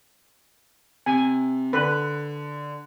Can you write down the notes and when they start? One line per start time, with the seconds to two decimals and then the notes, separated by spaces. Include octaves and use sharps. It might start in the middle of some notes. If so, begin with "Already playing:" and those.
1.06 C3 G#5
1.73 D3 B4